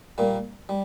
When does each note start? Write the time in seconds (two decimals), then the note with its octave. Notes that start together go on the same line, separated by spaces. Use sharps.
0.18 A#2 G3 A#3
0.69 G3